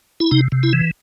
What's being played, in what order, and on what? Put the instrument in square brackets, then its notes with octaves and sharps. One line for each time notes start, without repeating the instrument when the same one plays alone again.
[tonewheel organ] E4
C3 D#4
C3
E4
E3